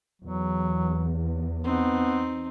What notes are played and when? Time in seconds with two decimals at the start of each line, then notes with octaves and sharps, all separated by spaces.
0.21 E2 F#3
1.64 B3 C4 D#4